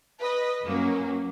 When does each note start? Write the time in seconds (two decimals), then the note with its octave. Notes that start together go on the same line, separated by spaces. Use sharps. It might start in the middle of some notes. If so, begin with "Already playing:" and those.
0.21 B4 D#5
0.64 F#2 F#3 A#3 C#4